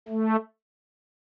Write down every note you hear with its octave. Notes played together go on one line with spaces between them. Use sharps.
A3